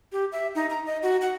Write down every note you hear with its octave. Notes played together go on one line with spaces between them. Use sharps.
G4
E5
D#4
A#5
D#5
F#4
F#5